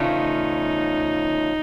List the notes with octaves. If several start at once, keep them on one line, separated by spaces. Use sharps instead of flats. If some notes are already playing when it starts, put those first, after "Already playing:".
Already playing: E2 C#3 F3 A3 C#4 D#4